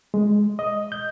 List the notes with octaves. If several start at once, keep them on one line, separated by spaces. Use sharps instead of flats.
G#3
D#5
G6